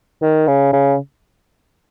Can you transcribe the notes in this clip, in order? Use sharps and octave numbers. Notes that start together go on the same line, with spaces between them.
D#3
C#3
C#3